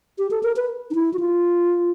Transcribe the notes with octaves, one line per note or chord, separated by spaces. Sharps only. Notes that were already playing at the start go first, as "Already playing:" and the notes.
G4
A4
A#4
B4
D#4
E4
F#4
F4